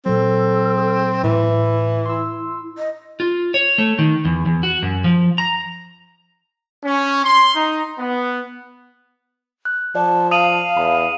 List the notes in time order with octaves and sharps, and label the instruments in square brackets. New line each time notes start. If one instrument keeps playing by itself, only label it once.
[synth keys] A#2 F#3 [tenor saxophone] C4 [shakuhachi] A4
[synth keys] A2 [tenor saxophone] E3 [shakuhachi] E4
[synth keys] C6 E6
[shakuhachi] D#5
[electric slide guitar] F4
C#5
A3
D#3
E2
E2
F#4
F#2
F3
A#5
[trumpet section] C#4
C6
D#4
B3
[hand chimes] F#6
[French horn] F3 [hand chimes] D5 [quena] A5
[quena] F5 [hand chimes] A5 [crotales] D#6 D#7 F#7
[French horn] E2 [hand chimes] B5